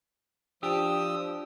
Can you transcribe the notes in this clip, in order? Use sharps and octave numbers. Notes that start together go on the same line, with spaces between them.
F3 D4 G4 D#6 E6